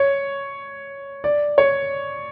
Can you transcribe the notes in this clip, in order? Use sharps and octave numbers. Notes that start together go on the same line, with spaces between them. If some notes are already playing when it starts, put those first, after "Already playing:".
Already playing: C#5
D5
C#5